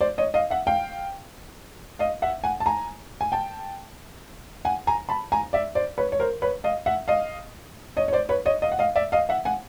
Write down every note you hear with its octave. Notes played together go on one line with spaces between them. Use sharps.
C5 D5
C#5 D#5
D#5 F5
E5 F#5
F5 G5
D#5 F5
E5 F#5
F#5 G#5
A5
G#5 A#5
G#5
G5 A5
F#5 G#5
G#5 A#5
A5 B5
G#5 A#5
D5 E5
C5 D5
B4 C#5
C#5
A#4 C5
B4 C#5
D#5 F5
E5 F#5
D#5 F5
C#5 D#5
C#5
C5 D5
B4 C#5
C#5 D#5
D#5 F5
F#5
D#5 F5
D5 E5
D#5 F5
E5 F#5
F#5 G#5